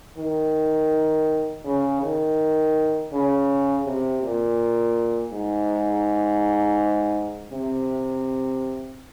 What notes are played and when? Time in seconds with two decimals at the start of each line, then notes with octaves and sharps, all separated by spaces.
0.18 D#3
1.64 C#3
2.02 D#3
3.12 C#3
3.85 C3
4.22 A#2
5.32 G#2
7.52 C3